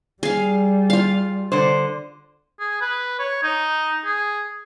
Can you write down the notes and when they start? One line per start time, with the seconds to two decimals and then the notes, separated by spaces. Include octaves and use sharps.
0.23 G3 G#4 F5
0.90 F4 F5
1.52 D3 C5
2.60 G#4
2.81 B4
3.19 C#5
3.43 D#4
4.06 G#4